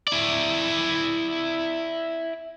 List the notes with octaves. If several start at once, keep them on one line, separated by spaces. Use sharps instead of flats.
E4 D5